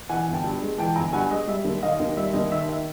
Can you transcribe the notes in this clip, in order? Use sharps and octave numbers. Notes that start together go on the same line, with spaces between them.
E3 F#5 G#5
G1
G5 A5
G2
G#3
E3 G5 A5
G1 G#5 A#5
G2 F#5 G#5
G#3 D#5
G3 E5
D#2
D#3 D#5 F5
D#2
G3 E5
D#2 D#5
D#3 E5
E5